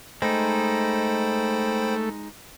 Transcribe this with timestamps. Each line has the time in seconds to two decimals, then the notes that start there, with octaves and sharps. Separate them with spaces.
0.22 G#3 A3 D#4 C5 G5 B5